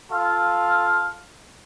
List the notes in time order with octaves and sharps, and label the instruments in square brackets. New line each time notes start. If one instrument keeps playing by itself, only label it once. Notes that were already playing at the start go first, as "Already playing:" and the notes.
[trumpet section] F4 A4 F5